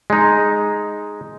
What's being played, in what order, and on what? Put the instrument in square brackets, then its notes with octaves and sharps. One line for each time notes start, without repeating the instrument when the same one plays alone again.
[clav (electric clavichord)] G#3 D#4